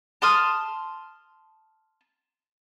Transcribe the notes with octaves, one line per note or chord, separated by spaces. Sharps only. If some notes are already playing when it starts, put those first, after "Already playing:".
A5 C6 D#6 F6